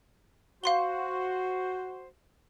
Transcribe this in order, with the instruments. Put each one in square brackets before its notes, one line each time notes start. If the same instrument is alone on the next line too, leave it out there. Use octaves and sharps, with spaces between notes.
[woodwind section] F#4 C5 [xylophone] F5 C6 G7